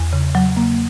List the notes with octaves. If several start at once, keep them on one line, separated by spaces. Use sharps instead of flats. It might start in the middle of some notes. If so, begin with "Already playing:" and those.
Already playing: E2
C#3
F#3
A#3